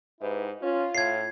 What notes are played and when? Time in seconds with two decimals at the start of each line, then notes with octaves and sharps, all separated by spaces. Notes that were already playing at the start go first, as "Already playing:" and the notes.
0.21 G#2 E4 G4 B4
0.62 C#4 F4
0.95 A2 G#6 C7